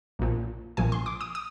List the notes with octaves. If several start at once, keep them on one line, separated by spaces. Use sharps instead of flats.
A#1 A#2 F3
A#1 A#2 F3 G#5
C6
D6
D#6
D#6